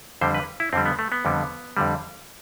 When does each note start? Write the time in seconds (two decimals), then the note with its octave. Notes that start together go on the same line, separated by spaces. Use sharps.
0.21 F2 D3 G3 C5
0.34 B4
0.60 E4
0.73 F2 D3 G3 C4
0.86 B3
0.99 A3
1.12 B3
1.25 F2 D3 G3
1.77 F2 D3 G3